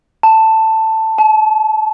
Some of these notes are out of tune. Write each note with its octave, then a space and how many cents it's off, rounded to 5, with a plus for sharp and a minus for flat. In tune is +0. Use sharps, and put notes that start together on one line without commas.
A5 +10
A5 -35